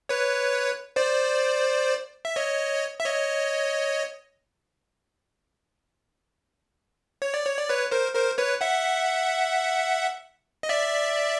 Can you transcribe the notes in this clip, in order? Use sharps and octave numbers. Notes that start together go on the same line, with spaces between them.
B4 C#5
C5 D5
E5
C#5 D#5
E5
C#5 D#5
C#5
D5
C#5
D5
B4 C#5
A#4 C5
A#4 C5
B4 C#5
E5 F#5
D#5
D5 E5